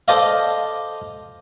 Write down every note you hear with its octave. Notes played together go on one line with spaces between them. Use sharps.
A4 C5 D5 D#5 F5